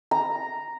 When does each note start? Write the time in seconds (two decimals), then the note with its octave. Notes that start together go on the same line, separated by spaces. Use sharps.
0.11 A#5